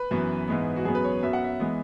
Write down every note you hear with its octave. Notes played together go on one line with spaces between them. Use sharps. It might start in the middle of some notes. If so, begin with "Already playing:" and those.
Already playing: B4
F#2 E3 B3
G#2 E3 G#3 B3
F#4
F#2 F#3 B3 G#4
B4
C#5
F#2 F#3 B3 E5
F#5
E5
E3 G#3 B3